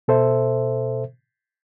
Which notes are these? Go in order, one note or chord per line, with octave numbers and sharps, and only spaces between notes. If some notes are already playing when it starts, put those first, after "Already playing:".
B2 A4 C5 E5